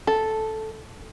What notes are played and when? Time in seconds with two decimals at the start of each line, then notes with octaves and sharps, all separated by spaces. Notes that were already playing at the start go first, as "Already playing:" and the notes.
0.07 A4